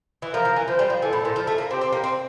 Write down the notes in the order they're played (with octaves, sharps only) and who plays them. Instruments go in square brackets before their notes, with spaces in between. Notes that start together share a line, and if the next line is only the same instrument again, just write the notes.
[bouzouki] E3
[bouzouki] F3 [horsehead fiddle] A#4
[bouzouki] F3
E3
[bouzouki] F3 [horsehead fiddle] C5
[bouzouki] G3
F3
[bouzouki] E3 [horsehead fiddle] A4
[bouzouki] A2
A#2
F3
A3
A#3
[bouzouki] C4 [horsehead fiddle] G4
[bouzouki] C4
A#3
C4